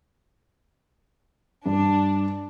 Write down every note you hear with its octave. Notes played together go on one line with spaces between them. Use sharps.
G2 D4